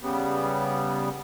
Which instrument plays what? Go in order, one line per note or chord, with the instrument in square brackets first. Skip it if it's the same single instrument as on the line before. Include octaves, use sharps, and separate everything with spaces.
[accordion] C#3 G3 B3